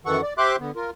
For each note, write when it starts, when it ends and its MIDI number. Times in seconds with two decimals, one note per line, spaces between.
0.06 0.21 42
0.06 0.21 51
0.06 0.21 52
0.06 0.21 69
0.06 0.21 78
0.06 0.21 85
0.22 0.33 74
0.38 0.56 67
0.38 0.56 72
0.38 0.56 76
0.38 0.56 84
0.38 0.56 86
0.38 0.56 90
0.60 0.71 50
0.60 0.71 59
0.76 0.90 65
0.76 0.90 70